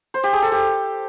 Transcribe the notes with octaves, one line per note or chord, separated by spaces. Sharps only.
C5
G4
G#4
A4
G4